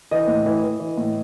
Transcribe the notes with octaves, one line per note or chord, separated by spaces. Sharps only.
E3 D#5
A2
E3
E3
E3
A2